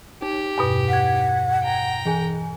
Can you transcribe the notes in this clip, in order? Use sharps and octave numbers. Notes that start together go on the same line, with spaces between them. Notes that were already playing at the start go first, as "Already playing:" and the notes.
D#4 G4
E2 G2 B2
F#5 G#6 B6
G5 A#5
E3 G#4 G#5